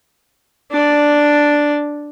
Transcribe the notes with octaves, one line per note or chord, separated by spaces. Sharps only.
D4 D5